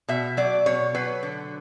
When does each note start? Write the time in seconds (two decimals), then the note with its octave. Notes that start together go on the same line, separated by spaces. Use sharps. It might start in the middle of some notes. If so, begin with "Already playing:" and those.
0.08 B2 E5
0.37 F#3 D5
0.66 B2 C#5
0.95 F#3 B4
1.23 D3